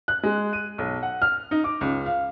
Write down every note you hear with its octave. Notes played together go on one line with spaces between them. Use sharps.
F#6
G#3
D#7
B1
F#5
F6
D#4
D6
C#2
F5